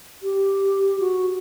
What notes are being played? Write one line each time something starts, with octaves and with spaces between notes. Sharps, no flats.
G4
F#4